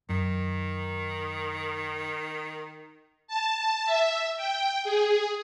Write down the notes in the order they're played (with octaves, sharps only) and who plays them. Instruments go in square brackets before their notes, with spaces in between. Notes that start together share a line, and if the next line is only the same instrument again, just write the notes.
[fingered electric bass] F#2 [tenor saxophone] D#3
[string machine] A5
E5
G5
G#4